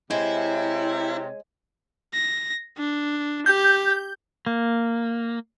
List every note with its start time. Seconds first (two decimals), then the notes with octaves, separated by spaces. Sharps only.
0.11 C3 G#3 E4 C#5
2.14 A#6
2.78 D4
3.46 G4 G6
4.46 A#3